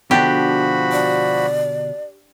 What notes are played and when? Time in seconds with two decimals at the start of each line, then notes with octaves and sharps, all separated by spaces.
0.11 B2 D3 F3 D4 F#4 G4 B5
0.92 D5